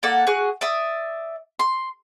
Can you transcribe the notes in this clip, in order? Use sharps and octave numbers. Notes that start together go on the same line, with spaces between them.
A#3 A4 D5 F#5
F#4 G#4 F#6
D5 E5 D#6
C6